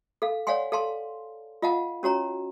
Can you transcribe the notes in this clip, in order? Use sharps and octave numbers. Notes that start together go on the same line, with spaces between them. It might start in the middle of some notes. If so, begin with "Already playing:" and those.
A4 F5
C#5 D5 F5 F#5 G#5 C6
A4 F5 A5 C6
F4 D#5 F5 F#5 A5
C#4 F#4 C#5 A#5